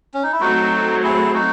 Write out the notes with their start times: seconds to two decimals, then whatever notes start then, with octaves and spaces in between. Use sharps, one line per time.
0.14 C#4
0.23 D#4
0.32 E4
0.41 F#3 A3 C4 D#4 F#4
1.04 E4 G#4
1.34 D#4 F#4